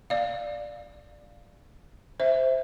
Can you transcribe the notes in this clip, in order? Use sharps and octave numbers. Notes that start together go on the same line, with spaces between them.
D5 F5
C5 E5